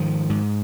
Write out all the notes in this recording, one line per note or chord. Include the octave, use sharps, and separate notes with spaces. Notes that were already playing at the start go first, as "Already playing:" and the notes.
Already playing: G#2 D#3 F3
G#2